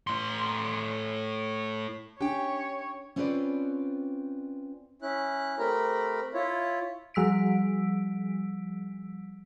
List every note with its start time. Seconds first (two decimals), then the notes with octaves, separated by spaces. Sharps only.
0.07 A2 C6
2.21 C#4 D4 G4 C#5 G5
3.16 C4 C#4 F4 B4 C5 D5
5.02 C#4 E4 F#6
5.59 A3 C4 G4 A#4 A#5 B5
6.34 E4 F4 C#5
7.14 F3 G3 E6 B6 D7